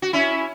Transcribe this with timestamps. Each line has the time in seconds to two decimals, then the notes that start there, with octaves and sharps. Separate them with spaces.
0.02 F#4
0.13 C#4 E4